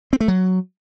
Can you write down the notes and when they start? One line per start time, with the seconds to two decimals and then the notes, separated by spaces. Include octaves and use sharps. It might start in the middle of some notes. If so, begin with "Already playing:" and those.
0.13 C4
0.20 A3
0.28 F#3